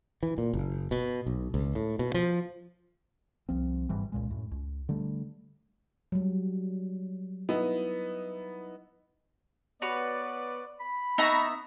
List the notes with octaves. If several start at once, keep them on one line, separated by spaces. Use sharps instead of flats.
E3
A#2
F#1
B2
B1
C#2
A2
B2
F3
C2 F3 C4
G1 G#2 E3 G3
C#2 A#2 G#3
F#2 A2
C#2
D3 G3 A3
F#3 G3
B3 D#4 E4
B3 F#4 B4 C#5 D5
B5
B3 D#4 E5 A#5 C#6